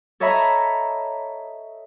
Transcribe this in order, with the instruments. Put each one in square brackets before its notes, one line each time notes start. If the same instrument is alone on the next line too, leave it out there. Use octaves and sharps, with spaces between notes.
[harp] A4 C#5 D#5 E5 A#5 B5